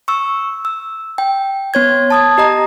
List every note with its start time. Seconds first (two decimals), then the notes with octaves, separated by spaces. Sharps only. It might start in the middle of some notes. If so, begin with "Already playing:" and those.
0.08 C#6 E6
0.65 E6
1.18 G5
1.74 B3 C#5 G#6
2.10 A5 D#6 G#6
2.38 G4 D#5 A#5